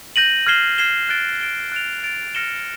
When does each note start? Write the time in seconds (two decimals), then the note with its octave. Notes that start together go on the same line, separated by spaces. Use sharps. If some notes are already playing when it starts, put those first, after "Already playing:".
0.16 G6 A#6 D#7 F#7
0.46 F6 G#6 C7 E7 G7
0.78 F6 G#6 C7 E7 G7
1.09 F#6 A6 D7 G7
1.41 F#6 A6 D7 G7
1.72 F#6 A6 D7 F7
2.03 F#6 A6 D7 F7
2.35 F6 A#6 C#7 E7 G7